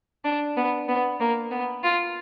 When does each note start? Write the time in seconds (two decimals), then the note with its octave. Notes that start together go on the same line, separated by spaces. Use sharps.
0.25 D4
0.57 B3
0.88 B3
1.20 A#3
1.51 B3
1.83 F4